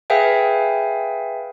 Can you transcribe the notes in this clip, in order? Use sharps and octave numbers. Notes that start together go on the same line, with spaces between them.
G#4 B4 E5 F5 G5 G#5